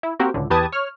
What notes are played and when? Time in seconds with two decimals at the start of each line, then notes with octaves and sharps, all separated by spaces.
0.03 E4
0.20 A#3 C4 F#4 G4 A#4
0.34 C#2 A2 D3
0.50 E2 G4 B4 A5 D#6 G#6
0.72 C#5 F6